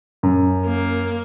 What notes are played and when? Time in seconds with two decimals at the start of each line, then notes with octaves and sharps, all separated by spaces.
0.23 F#2
0.65 A#3